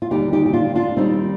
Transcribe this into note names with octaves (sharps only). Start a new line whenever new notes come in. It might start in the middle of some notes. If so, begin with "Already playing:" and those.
F4
D#2 D3 G3 D#4 G4
D#4 G4
G4
D4 F4
D4 F4
D#2 D#3 G3 C4 D#4